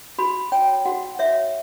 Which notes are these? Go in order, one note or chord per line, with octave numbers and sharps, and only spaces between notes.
F#4 B5
C#5 G5
F#4 F#5
C#5 E5